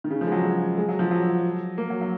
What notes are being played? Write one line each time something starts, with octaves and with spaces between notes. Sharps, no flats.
D#3
C#3
F3
G#3
F#3
G#3
G#3
F#3
F3
F#3
A#3
F#3
F#3